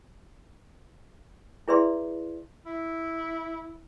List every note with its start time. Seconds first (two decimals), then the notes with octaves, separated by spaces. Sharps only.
1.68 E4 G#4 B4 D5 E5 C6
2.66 E4